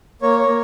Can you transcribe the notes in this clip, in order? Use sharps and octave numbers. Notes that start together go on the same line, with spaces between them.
A#3 C#5
C#5
A#3